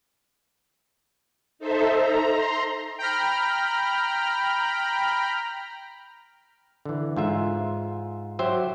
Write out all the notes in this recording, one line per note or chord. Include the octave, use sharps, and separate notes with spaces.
D#4 A4 C5 E5
A#5
A#5 C6
G5 A#5 B5 F6
D3 E3
G#2 F4 E5
F#3 G4 C5 E5